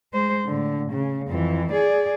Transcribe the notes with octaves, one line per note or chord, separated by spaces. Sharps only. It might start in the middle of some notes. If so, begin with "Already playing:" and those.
G#3 C5
A2 D3
C#3
F2 E3
G#4 D5